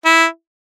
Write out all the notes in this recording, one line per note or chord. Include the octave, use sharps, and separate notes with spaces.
E4